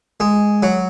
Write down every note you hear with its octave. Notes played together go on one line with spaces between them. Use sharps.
G#3
F#3